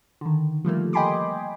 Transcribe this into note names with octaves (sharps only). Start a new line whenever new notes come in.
D3 D#3
F3 G3 A3 A#3
D#5 G5 G#5 B5 C6 D6